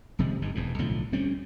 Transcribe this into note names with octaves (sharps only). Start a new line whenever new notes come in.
D#1 C3 F3 G#3
G1 G2 D#3
E1 E2 G#2
B1 A2 D3 F3
D2 G3 C4 C#4